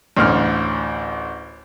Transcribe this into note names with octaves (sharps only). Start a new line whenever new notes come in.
A1 D2 F6